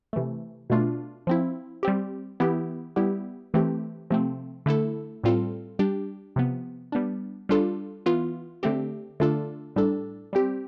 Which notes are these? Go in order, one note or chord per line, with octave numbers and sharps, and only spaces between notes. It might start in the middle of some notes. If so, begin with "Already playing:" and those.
C3 E3 A3
B2 A3 D4 F4
F3 C4 E4
G3 C4 G4
E3 B3 E4 G4
G3 B3 E4 G4
E3 A3 C4 G4
C3 F3 A3 C4
D3 A3 E4 A4
A2 G3 C4 F4 A4
G3 D4 G4
C3 F3 B3
G3 B3 D4
G3 D4 F4 A4
E3 B3 F4
D3 A3 C4 G4
D3 A3 D4 F4 A4
A2 G3 D4 A4
G3 C4 G4